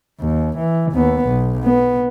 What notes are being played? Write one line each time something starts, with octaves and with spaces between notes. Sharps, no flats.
D#2
E3
D#2 B3
B1
B3